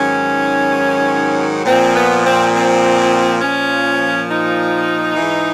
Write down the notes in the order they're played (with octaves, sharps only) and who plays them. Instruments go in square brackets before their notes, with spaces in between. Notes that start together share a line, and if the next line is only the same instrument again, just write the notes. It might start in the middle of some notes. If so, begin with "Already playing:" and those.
Already playing: [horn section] G#2 D#3 F#3 C#4
A#2 F3 C4
B3
C4
C4
A#2 F3 C#4
D#4
G#2 E3